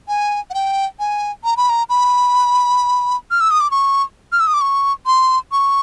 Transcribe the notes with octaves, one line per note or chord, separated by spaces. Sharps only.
G#5
F#5
G5
G#5
A#5
B5
A#5
B5
F6
E6
D#6
D6
C#6
F6
E6
D#6
D6
C#6
C6
C#6